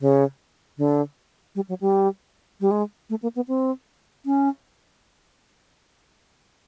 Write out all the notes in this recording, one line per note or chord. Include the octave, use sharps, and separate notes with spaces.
C#3
D3
G3
F#3
G3
G3
G#3
A3
A#3
B3
C4
C#4